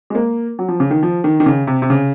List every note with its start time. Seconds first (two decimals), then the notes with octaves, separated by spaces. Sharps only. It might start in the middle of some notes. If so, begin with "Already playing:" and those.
0.10 G#3
0.15 A#3
0.59 F#3
0.68 F3
0.80 C#3
0.91 D#3
1.03 F3
1.24 D#3
1.40 D#3
1.46 C#3
1.67 C3
1.82 C3
1.90 C#3